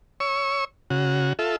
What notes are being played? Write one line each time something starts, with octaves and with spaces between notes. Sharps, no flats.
C#5 C#6 E6
C#3 F#4
F4 A4 E5